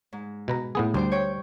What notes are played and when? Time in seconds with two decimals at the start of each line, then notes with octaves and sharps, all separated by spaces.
0.13 G#2
0.48 B2 B4 A#5
0.75 A2 B3 G#4
0.94 D2 G3 C5 G5
1.12 C#5 G5